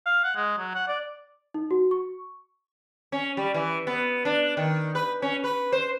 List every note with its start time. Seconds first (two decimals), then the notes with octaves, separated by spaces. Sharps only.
0.06 F5
0.24 F#5
0.36 G#3
0.58 F#3
0.74 F#5
0.88 D5
1.54 D#4
1.71 F#4
1.91 C#6
3.12 C#4
3.37 G3
3.54 E3
3.87 B3
4.25 D4
4.57 D#3
4.95 B4
5.22 C#4
5.44 B4
5.72 C5